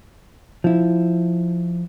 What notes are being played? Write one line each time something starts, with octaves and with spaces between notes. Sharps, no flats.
F3 E4